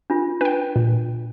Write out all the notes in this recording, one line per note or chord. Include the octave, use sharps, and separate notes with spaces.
D4 F4
D4 B4 G5
A#2